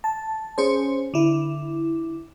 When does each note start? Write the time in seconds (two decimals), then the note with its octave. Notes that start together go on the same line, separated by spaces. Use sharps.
0.04 A5
0.58 C#4 G#4 C5
1.14 D3 E4